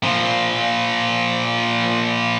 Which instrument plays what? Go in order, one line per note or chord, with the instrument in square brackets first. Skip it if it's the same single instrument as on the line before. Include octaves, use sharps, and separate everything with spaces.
[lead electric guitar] A#2 F3